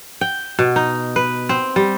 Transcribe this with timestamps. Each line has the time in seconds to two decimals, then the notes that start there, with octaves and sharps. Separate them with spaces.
0.21 G5
0.59 B2
0.76 D#4
1.16 B4
1.49 C4
1.76 G3